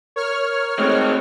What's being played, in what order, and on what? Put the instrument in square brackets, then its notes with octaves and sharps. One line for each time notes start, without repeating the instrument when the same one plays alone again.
[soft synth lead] A#4 [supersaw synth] C#5 F6
[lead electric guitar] G#3 C4 [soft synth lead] A3